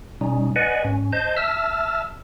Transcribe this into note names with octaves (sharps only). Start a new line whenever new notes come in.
B2 G3 C#4 D#4
B4 D5 D#5 F#5 G#5
G#2 C#4
C5 D#5 A5 G6
E5 A5 E6 F6